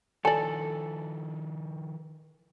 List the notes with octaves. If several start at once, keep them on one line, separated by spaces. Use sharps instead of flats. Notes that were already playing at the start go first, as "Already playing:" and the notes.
D#3 F3 A4 D5 G#5